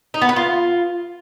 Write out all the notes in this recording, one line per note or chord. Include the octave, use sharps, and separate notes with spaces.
D#4
B3
B4
F4